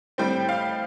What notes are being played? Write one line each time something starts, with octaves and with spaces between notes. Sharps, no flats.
A2 G3 C4 G5
F5